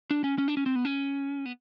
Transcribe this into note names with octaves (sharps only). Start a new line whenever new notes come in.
D4
C#4
C#4
D4
C#4
C4
B3
C#4
B3